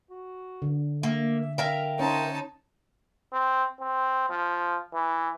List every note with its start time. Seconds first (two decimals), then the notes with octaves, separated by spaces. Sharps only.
0.10 F#4
0.62 D3
1.03 A#3 E5
1.58 A#4 E5 F5 G5
1.99 C#4 D#4 C5 C#5 A5
3.33 C4
3.80 C4
4.30 F3
4.94 E3